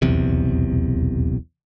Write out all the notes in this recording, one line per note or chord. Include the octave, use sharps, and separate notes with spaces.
D#1 B1 E2 C3